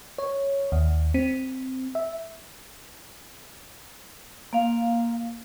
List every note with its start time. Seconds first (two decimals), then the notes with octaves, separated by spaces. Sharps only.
0.18 C#5
0.72 D#2
1.14 C4
1.95 E5
4.53 A#3 F5